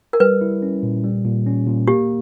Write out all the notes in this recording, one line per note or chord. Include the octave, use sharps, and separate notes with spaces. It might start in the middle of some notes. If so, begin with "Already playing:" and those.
A#4
G3 B4
E4
C#4
A#2
G3
A#2
C#4
A#2
A#3 G4